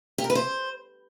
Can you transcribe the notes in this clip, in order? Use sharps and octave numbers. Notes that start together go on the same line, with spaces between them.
G4
A#4
B4
C5